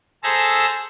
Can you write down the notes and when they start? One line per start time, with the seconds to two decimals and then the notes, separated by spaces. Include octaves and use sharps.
0.23 G#4 A4 C5 E5 A5 A#5